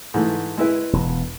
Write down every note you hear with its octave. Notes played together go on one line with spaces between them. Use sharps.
G#2 E3 A3
G#3 E4 B4
E1